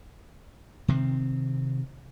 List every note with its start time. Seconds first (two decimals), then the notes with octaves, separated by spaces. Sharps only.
0.88 C3 D#3 C4